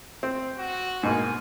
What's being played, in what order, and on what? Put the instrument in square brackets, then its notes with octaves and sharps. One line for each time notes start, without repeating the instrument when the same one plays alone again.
[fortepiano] C4
[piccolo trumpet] F#4
[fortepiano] G#2 B2 A#3 [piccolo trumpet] G#5